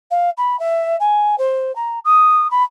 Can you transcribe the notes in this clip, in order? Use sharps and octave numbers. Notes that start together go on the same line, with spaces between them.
F5
B5
E5
G#5
C5
A#5
D#6
B5